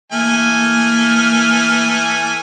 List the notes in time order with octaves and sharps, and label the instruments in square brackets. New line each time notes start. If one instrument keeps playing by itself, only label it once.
[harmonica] E3 A3 G#5 [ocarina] A#3 [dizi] F6